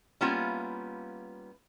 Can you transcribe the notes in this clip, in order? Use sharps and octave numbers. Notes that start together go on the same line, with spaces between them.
G3 A#3 B3 C#4 E4 F4